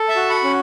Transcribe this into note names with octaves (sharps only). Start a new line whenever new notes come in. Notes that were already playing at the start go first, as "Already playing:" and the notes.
Already playing: A4
E5 A5
F#4
F#5 B5
C#4